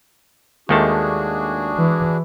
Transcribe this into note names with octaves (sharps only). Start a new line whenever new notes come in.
D#2 D#3 G#3 A3 D4 F#4 G#4 A5
E3